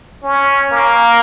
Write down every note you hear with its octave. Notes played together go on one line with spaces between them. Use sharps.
C#4
A#3